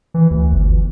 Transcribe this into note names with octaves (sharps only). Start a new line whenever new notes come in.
E3
D2
G1